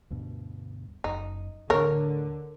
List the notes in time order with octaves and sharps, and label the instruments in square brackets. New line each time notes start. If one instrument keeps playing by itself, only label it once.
[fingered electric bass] D2 G2 B2
[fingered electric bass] F#1 F#2 [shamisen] D#4
[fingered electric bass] D2 A2 [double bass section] D3 [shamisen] A#4 C#5